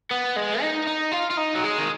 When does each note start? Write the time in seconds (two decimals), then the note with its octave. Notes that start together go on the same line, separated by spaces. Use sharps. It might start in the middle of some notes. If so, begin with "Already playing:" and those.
0.11 B3
0.36 G#3
0.62 D#4
0.88 D#4
1.13 F4
1.31 F4
1.38 D#4
1.55 F#3
1.64 G#3
1.78 D#3